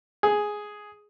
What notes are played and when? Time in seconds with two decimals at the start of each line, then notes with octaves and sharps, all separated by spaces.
0.23 G#4